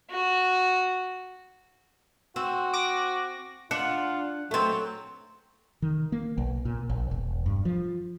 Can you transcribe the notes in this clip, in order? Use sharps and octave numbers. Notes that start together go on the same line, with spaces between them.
F#4
C4 F#4
D6 A#6
D4 F4 F#5
F#3 A3 C4
D#3
A#3
B1
A#2
A#1
E1
G2
F3